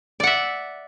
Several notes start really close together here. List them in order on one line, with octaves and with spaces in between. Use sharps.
D5 F#5 E5